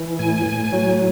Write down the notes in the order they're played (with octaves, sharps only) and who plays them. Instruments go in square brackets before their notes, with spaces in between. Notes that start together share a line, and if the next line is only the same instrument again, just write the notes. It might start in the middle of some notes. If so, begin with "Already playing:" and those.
Already playing: [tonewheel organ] E3
A2 G#5
A2
F#3